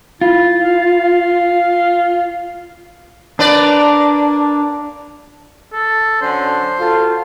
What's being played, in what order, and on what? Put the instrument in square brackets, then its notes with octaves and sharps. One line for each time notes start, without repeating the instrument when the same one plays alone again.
[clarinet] E4 [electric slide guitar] F4
[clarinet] F5
[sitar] A#3 B4 D5 [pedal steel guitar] D4
[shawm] A4
[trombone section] D3 F#3 C#4 [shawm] C5
[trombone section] F4 F#4 A4